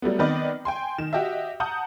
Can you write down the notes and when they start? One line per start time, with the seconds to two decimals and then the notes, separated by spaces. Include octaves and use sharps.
0.02 F#3 G3 A3 B3
0.19 D#3 B3 C4 B4 D5 D#5
0.65 G5 G#5 C6
0.98 D#3 E7
1.13 F#4 G4 D#5 E5
1.60 F#5 A5 A#5 D#6 G6